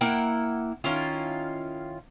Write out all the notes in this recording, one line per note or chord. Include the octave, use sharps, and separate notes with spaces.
A#3 E4 F#5 G5
D#3 C#4 E4 F4